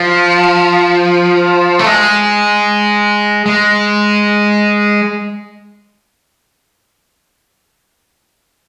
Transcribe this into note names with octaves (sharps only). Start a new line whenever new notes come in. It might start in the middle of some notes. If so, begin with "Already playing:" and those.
Already playing: F3
A3
G#3
G#3